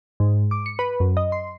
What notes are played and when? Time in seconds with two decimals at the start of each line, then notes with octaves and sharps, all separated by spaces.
0.20 G#2
0.51 D6
0.66 C#7
0.79 B4
1.00 F#2
1.17 D#5
1.32 C6